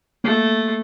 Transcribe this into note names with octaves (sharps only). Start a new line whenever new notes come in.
A3 A#3